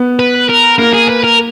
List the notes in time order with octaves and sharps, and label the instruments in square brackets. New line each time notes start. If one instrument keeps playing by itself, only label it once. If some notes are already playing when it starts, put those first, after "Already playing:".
Already playing: [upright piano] B3
[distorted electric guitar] B4
A#4
[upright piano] A#3 [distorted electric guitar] A#4
[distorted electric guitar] G#4
B4
A#4